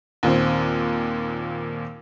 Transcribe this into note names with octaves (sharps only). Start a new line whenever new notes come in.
D#2 A#2 C4